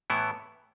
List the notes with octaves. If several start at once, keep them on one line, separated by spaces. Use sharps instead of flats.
A2 E3 B3 E4